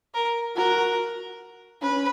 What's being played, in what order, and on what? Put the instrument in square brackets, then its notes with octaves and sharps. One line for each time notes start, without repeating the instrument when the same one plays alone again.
[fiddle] A#4
[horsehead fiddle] F#4 [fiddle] A#4
[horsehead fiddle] C#4 [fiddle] B4